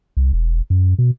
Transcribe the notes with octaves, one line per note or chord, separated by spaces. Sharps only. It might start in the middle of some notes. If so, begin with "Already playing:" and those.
C2
E1
F#2
B2